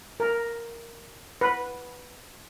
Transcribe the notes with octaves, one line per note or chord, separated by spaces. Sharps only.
A#4
B4